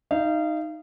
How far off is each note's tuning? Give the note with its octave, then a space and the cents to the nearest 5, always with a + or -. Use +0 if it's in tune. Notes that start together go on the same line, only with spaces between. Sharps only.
D#4 +0 F5 -30